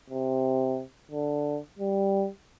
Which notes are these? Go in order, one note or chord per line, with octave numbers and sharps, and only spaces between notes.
C3
D3
G3